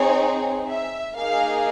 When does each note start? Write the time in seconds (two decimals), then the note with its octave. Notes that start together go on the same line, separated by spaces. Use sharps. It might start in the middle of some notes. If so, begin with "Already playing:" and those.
Already playing: C4 D#4 G#4 C#5
0.68 E5
1.16 A#3 D#4 G#4 F5